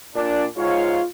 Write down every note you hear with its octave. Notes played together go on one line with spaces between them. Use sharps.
A#2 D4
G#2 F4 C#5 F5